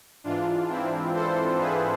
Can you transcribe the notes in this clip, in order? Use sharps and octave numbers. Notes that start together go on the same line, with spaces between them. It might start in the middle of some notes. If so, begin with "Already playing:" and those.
G#2 E3 D4 F4
C4 E4
A4 C5
G#4 B4